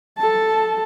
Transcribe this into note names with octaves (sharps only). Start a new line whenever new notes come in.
A4 A5